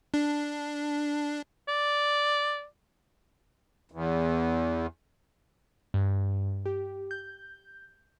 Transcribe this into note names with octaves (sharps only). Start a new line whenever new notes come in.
D4
D5
E2
G2
G4
G6